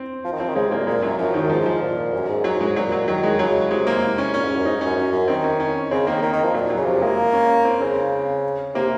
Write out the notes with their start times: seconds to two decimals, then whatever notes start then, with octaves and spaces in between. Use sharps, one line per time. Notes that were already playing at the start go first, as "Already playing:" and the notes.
Already playing: C4
0.24 F3
0.32 D#3
0.40 F3 C4
0.49 D#3
0.55 C#3 G#3
0.66 C3
0.71 G#2 A#3
0.76 A#2
0.87 A#2 G#3
1.02 F#2 F#3
1.18 F#2 F3
1.34 D#3
1.44 F#2
1.49 G#2 F3
1.66 F3
1.82 A#2
2.14 F#2
2.29 G#2
2.44 F#3
2.60 F#2 G#3
2.68 G#2
2.76 A#2 F#3
2.92 F#3
3.07 D#3 F#3
3.23 G#3
3.39 C#3 F#3
3.70 C3 G#3
3.87 A#3
4.18 C#4
4.33 A#2 C#4
4.44 G#2
4.55 F#2
4.65 G#2 D#4
4.81 C#4
4.86 F#2
4.96 F#2
5.13 F#2
5.28 D#3 C4
5.44 C#4
5.60 C#4
5.91 C#3 C4
6.07 D#3 A#3
6.22 D#3
6.33 D#3
6.44 F3
6.54 A#2 F#3
6.70 F#3
6.77 C#3
6.86 C3 F3
7.02 G#3 A#3
7.33 C#4
7.65 C4
7.81 C#3 C4
8.75 C3 A#3